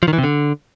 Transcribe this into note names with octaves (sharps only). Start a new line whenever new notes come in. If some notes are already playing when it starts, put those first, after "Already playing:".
F3
D#3
E3
C3
D3